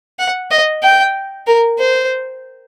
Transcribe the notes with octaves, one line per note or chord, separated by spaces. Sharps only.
F#5
D#5
G5
A#4
C5